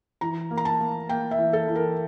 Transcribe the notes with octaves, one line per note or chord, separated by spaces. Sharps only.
E3 A#5
A#3
A#5
A5
A#3
A#3 G5
E5
E3
A4
E3
A#4